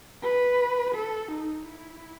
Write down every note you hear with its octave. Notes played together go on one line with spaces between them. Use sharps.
B4
A4
D#4
E4